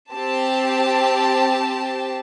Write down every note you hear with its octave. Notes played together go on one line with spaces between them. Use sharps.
C4 G4 A5